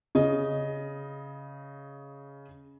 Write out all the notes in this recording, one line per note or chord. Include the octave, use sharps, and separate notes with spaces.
C#3 D#5